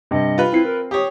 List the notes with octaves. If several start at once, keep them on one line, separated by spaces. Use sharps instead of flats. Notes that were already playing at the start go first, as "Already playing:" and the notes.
G2 C3 D#5
F4 B4
C4 E4 C7
A#4
G4 C#5 D#6